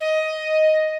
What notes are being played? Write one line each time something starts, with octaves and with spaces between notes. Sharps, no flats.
D#5